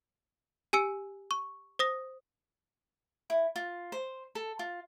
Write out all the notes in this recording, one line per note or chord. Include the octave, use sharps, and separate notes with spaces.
G4 G#5 E6 C#7
C#6
C5 D#6 A#6
E4
F4
C5
A4
F4